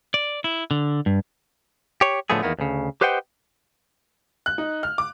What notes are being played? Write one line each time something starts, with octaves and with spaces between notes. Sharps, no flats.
D5
E4
D3
G2
G4 C#5
A2 D3 F3 A3 B3 G#4
E2 D#3 A#3 B3
D2 C#3
G4 B4 C5 D#5 F#5 G5
F#6
D#4
F6
D6